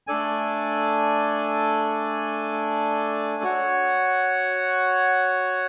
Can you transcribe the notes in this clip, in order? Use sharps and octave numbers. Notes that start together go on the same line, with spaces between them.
A3 D4 A4 D5 G#5
F#4 C#5 F#5